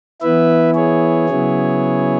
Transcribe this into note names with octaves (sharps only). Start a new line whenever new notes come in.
E3 B3 E4 B4 E5
G#4 C#5
C#3 F#3 B3 E4